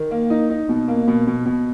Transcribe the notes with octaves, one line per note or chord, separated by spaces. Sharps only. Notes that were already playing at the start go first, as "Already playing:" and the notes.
Already playing: D#3
A#3
D#4
D#4
B2
A#3
B2
B2
B2